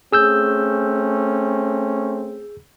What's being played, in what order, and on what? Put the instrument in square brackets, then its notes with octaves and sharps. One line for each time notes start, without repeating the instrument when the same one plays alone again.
[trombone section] A3 C4 C#4 [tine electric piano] G#4 E6 G6